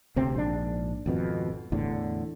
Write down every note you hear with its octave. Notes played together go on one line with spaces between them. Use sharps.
D2 C3 C4
A#1 G#2 D4
G#1 F2 B2
E2 A2 D3